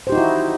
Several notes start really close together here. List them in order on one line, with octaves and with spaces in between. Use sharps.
C5 G4 D#4 F#4 E4